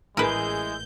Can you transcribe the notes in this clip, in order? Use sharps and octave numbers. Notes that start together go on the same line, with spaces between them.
A1 G#3 E4 G#4 A#4 B4 G6